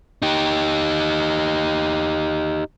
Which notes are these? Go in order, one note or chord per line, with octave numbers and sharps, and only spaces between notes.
D#4 G4